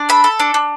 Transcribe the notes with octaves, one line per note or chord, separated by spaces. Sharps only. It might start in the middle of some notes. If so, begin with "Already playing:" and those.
Already playing: D4
A4 B5
A4
D4
D4